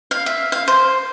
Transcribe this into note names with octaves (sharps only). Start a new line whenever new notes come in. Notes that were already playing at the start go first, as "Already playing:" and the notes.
F5
E5
F5
C5